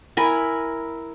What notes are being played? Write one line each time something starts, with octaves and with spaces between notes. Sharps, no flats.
E4 A#4 G#5 B5